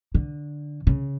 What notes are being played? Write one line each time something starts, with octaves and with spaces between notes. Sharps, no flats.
D3
C#3